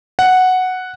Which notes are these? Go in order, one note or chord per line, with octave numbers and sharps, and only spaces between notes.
F#5